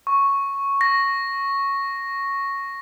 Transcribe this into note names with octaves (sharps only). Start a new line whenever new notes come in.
C#6
A#6